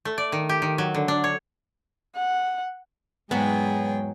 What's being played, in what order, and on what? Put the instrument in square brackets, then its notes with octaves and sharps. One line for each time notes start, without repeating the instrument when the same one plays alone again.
[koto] A3
D5
D#3
G4
D#3
F#3
D3
D4
C#5
[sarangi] F#5
[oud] E2 G#2 F#3 [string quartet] G#3 G#4 G5 [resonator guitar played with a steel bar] B3